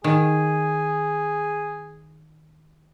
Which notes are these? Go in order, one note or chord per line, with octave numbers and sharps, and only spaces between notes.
D#3 G#4